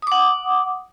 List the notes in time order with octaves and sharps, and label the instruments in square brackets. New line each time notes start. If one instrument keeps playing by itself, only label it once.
[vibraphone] D#6
D6
F#5